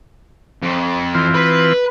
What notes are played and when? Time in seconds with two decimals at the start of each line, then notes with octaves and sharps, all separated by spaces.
0.62 F2
1.15 E3 C4 F4
1.34 B4